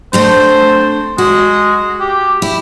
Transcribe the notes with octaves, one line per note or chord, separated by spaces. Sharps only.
A3 C4 D4 C5
G#3 F#4
G4
E4